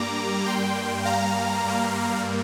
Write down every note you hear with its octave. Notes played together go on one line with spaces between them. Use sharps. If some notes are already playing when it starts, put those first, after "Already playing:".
Already playing: G2 G3 A#3 A#5 D6
G5 C6
F5 A#5
G2 G3 A#3